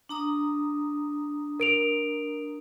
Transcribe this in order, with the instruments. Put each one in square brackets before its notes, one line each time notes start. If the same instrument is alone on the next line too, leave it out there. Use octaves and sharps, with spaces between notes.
[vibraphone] D4 A#5 D#6
[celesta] A#4 D7 F7